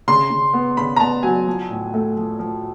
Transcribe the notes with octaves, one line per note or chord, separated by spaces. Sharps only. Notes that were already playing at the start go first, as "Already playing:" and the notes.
C#3 C6
C#3
B3
C#3 B5
A#5
B3 A5
F#3 G#5
F3
A2
A3
F3
F3